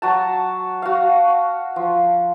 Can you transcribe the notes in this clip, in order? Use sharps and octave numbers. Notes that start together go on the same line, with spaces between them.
F#3 F#4 A5
F#4 F5
F3